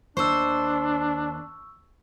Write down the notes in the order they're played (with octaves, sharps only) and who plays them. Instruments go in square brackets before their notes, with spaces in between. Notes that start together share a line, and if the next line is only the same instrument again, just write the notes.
[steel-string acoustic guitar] D#2 C5 [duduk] D4 [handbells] C#6 E6